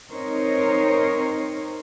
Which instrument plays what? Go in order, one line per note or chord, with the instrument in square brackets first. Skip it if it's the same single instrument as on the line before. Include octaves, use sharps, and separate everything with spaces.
[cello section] C4 D#4 A#4 C5 C#5